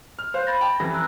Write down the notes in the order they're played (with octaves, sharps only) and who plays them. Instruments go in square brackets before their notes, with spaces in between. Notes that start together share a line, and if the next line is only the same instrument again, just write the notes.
[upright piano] F6
[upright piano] C5 F5 [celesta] F#6 G6
[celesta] B5 A6 A#6
[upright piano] G5 A5
[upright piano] F2 E3 G3 [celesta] A#6
[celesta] A#5 E6 F#6